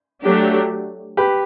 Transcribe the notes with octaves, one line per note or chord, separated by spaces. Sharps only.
F#3 A3 D4 G4
G4 B4